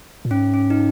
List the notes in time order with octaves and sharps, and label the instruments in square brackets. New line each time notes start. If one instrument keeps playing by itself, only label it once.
[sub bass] A#2
[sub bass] G#2 [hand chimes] C#4
[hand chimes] C#4
D#4